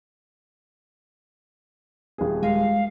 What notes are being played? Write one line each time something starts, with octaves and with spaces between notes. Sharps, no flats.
D#1 G#4
G#3 F5